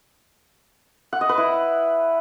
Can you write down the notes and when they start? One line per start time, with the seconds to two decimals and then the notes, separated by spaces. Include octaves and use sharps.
1.13 F#5
1.21 D#5
1.29 B4
1.38 E4